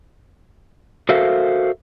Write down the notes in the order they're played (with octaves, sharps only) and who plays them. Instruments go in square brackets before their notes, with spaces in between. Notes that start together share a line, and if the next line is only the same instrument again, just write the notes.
[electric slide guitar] F#4 A4 A#4 C5 E5 F5